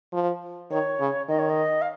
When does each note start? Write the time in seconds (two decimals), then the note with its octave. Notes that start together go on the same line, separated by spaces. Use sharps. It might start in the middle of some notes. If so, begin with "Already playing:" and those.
0.13 F3
0.70 D#3 C#5
1.00 C#3
1.28 D#3 D#5
1.38 C#5
1.49 D#5
1.81 F5